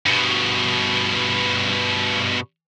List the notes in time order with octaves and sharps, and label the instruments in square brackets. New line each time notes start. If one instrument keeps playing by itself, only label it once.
[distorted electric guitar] G2 B2